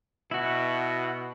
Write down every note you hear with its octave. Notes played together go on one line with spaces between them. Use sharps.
B2 E4 F#4